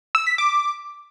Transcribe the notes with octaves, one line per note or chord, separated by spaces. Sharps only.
E6
B6
D6